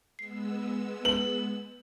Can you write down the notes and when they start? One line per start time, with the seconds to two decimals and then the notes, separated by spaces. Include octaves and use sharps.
0.19 G#3 B3 E6 C7
1.05 B4 F#7